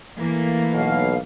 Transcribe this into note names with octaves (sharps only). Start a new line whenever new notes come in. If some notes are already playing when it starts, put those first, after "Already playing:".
E3 A3 A#3
B1 B2 F5